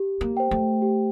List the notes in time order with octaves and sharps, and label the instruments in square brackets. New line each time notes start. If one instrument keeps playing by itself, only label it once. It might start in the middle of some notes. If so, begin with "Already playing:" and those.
Already playing: [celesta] G4
[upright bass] A#3
[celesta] C5 G5
[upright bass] A3
[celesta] G4